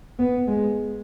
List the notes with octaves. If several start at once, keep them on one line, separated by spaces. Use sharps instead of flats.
B3
G#3